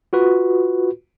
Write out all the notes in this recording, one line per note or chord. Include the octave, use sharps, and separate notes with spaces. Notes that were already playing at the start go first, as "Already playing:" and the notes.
F4 F#4 B4